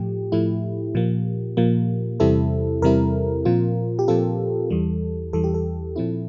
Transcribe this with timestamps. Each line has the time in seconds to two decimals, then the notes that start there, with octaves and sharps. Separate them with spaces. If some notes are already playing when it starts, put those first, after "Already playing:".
Already playing: A2 F3 A3 G4
0.32 A2 F3 A3 E4
0.95 A#2 F3 A#3
1.57 A#2 F3 A#3
2.20 E2 C3 G3 C4 E4 A4
2.82 E2 C3 G3 C4 E4 A#4
3.45 A#2 F3 C4 F4
3.99 G4
4.08 A#2 F3 C4 F4 A4
4.70 E2 E3 G3
5.33 E2 E3 G3 A4
5.44 G4
5.54 A4
5.96 A#2 F3 C4 E4